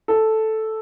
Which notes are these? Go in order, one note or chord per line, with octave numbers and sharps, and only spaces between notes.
A4